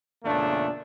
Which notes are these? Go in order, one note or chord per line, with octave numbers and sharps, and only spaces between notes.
E2 A#2 C#3 A3 D4